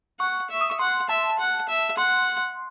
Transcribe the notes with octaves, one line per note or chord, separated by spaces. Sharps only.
F#5 C#6
E5
D#6
C#6
F#5 C6
E5 A5
F#5
E5
F#5 C6